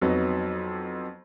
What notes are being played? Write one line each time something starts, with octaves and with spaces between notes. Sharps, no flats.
F2 F#3 B3 D#4